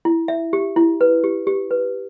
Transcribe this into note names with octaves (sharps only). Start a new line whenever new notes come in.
E4
E5
G4
E4
B4
G4
G4
B4